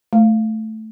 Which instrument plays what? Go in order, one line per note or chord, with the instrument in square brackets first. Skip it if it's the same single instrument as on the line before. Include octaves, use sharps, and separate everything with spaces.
[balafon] A3